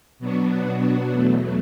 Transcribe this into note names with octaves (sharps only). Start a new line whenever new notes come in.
B2 F#3 B3 D4 F#4
E2 B2 F#3 A3